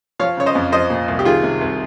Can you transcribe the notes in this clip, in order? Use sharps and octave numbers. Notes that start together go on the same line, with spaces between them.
F3 C#5 F5
C#3 C#5
C5 D#5
F2
F3 C5 D#5
A#2
C2
G4
D#3 F4 G#4
C3
C2